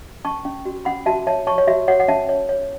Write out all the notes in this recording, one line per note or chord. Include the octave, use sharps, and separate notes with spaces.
C#4 A5 C#6
C#4
F#4
C#4 F#5 B5
F#4 E5 A5
C#5 E5 A5
C#5 A5 C#6
C#5
F#4 E5
F#4 C#5 F#5
F#5
C#4 E5 A5
C#5
C#5